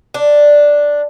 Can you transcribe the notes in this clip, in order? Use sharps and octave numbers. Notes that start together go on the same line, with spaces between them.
D4